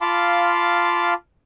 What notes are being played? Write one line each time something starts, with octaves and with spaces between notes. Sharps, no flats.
F4 F5 A5 B5 C6 D6